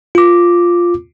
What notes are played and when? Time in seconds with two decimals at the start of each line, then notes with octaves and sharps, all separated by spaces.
0.15 F4 D6